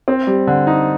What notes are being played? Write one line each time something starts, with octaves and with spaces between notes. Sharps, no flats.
C4
G3
D3
D#4